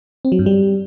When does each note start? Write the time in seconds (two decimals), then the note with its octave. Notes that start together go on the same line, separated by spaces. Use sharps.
0.25 C4
0.32 F#3
0.39 G2
0.46 G3